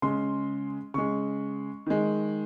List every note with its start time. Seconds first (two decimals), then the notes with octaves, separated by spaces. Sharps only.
0.02 C#3 G#3 C6
0.94 C#3 G#3 C#6
1.86 D#3 G#3